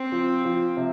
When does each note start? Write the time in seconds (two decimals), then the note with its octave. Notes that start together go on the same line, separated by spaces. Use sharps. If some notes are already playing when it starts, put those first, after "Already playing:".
Already playing: C4
0.12 F3
0.45 F3
0.77 C3